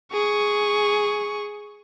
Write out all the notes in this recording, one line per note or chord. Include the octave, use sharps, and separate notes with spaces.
G#4 C#6